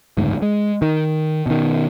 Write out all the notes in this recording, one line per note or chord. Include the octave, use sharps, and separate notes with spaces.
F#1 D2 G#2
G#3
D#3
B2 D#3